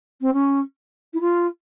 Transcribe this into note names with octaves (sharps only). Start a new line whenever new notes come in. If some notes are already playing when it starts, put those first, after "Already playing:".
C4
C#4
E4
F4